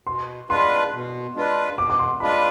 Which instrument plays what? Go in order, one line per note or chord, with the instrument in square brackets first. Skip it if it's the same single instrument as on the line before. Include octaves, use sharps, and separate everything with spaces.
[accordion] B2 [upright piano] C6
[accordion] G#3 D4 F4 B4 [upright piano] C6
[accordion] B2
G#3 D4 F4 B4
[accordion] B2 [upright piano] D6
[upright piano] D6
C6
[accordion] G#3 D4 F4 B4 [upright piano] B5